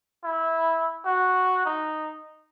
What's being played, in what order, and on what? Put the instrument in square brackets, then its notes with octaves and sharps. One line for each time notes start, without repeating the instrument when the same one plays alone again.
[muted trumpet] E4
F#4
D#4